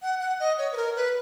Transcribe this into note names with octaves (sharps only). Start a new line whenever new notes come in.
F#5
F#5
D#5
C#5
B4
A#4
B4